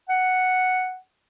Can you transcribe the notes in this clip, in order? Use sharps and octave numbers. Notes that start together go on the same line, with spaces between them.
F#5